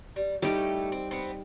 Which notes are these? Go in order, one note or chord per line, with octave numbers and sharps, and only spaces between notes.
G3
A2 G3 A3 D#4 G4
C4
B3 C4